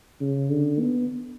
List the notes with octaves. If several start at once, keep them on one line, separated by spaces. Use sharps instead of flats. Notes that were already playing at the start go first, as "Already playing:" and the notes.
C#3
D3
B3